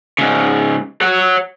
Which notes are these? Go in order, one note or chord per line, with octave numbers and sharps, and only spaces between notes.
G#2 C#3
C#5 F#5